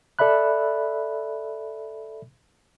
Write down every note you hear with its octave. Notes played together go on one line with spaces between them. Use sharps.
A4 D5 E5 B5 F#6